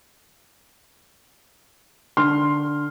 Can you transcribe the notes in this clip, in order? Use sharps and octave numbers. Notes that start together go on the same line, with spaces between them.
D3 C6 F6